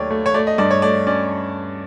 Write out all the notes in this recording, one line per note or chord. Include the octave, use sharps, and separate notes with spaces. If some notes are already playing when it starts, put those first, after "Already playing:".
Already playing: D#2 F#3 A3 C#5 D5
A3
C#5
A3 D5
D#5
G2 D5
C#5
A3 D5
C#4 D5